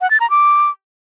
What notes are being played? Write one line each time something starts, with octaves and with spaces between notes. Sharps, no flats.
F#5
A6
A#5
D6